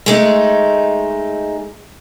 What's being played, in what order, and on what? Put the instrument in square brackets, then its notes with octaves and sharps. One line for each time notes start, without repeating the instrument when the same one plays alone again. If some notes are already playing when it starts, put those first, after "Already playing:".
[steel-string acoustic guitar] G#3 A3 D#4